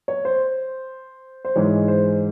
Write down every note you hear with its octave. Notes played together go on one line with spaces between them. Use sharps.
C#5
C5
C5
G#2 E3 G#3 C#5
C5